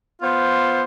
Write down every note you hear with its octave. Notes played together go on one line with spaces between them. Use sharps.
B3 F4 C5